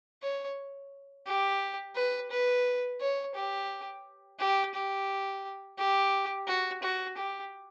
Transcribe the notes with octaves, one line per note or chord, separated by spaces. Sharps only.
C#5
G4
B4
B4
C#5
G4
G4
G4
G4
F#4
F#4
G4